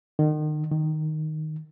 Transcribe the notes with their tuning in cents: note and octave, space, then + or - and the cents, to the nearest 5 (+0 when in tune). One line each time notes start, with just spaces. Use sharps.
D#3 -35
D#3 -5